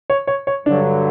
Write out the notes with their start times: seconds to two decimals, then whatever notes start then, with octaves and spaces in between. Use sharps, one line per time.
0.10 C#5
0.27 C#5
0.47 C#5
0.66 G2 D3 F#3 D4